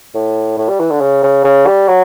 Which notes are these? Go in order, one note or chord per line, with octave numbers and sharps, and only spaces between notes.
A2
A2
G3
E3
D3
C#3
C#3
C#3
G3
F#3